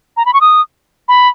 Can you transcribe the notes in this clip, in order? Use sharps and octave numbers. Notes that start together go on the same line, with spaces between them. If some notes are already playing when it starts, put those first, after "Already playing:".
A#5
B5
C#6
D#6
B5